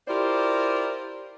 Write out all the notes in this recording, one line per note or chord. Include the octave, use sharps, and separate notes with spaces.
E4 F4 G4 A#4 C5 D5